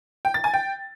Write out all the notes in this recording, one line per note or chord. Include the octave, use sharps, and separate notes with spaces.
G5
A6
G#5
G5